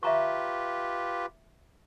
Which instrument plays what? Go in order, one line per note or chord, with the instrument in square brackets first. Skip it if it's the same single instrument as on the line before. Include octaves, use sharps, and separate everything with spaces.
[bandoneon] F4 G4 B4 [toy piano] E5 A#5 C#6